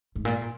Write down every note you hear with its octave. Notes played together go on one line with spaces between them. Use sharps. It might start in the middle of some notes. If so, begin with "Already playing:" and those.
G#2
A#2
A#2